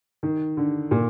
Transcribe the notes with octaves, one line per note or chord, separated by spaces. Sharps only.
D#3
D3
A#2